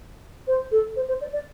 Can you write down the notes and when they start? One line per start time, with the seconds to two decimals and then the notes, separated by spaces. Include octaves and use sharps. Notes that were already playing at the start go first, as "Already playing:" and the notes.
0.47 C5
0.71 A4
0.96 C5
1.08 C5
1.21 D5
1.32 D5